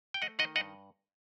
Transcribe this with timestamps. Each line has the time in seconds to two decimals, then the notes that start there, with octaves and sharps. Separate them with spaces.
0.14 G5
0.22 A3 D#5 F#5
0.39 D#3 D#5 F#5
0.55 G2 D#5 F#5